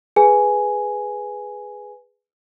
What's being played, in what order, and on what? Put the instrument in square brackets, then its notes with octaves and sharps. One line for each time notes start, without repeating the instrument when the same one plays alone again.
[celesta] G#4 B4 G#5